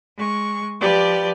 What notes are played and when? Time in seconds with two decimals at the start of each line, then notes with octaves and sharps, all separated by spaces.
0.16 G#3 C#6
0.81 F3 G4 B4 D5